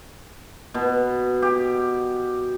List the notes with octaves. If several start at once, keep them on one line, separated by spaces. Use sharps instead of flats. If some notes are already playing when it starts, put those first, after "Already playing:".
B2
G4